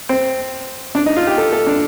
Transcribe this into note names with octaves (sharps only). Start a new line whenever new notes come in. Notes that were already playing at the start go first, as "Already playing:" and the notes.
C4
D4
D#4
F4
G4
A4
A4
D4